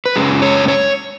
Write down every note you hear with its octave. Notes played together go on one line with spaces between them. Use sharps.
B4
F#2 C#3 G#3 C#4 G#4
C#5
C#5